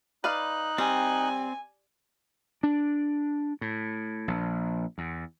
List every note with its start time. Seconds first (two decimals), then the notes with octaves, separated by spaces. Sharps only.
0.24 D#4 B4 D5 F5 F#6
0.78 G3 C4 G#5
2.63 D4
3.61 A2
4.28 A#1
4.98 E2